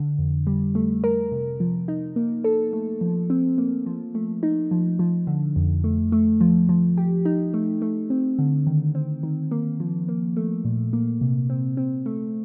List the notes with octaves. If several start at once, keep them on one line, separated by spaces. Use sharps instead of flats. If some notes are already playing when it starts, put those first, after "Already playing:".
Already playing: D3
F2
G3
A3
A#4
C3
F3
D#4
A#3
A4
A3
F3
C4
A#3
F3
A3
D#4
F3
F3
D3
F2
A3
A3
F3
F3
G4
D#4
A3
A3
C4
D3
D#3
C4
D#3
A#3
F3
A#3
A3
A#2
A#3
C3
C4
C4
A3